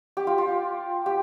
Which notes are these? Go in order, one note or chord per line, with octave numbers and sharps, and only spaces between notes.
G4
F4
F4
G4